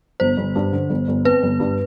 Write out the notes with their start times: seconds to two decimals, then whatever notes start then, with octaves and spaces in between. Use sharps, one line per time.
0.20 G1 C5
0.37 G1
0.56 G2
0.73 D3
0.90 G1
1.08 G1
1.25 C4 B4
1.43 G1
1.60 G2